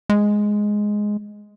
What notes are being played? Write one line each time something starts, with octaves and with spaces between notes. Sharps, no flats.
G#3